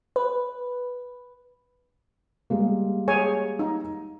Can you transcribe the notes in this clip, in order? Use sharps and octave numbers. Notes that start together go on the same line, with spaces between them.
B4
G3 G#3 A#3
G#4 C#5 G#5
D#4